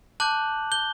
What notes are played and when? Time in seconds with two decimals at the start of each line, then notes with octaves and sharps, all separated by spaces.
0.20 A5 D6 F#6 G6 F#7
0.72 G6 G7